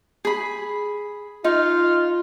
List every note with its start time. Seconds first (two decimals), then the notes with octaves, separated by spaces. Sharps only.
0.25 G#4 B5
1.44 D#4 F4